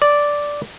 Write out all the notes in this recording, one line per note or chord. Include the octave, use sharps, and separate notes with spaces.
D5